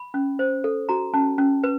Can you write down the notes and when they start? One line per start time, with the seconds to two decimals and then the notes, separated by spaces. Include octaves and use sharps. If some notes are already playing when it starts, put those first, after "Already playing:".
Already playing: B5
0.14 C#4
0.39 C5
0.64 A4
0.89 F#4 A#5
1.14 C#4 A5
1.38 C#4
1.64 B4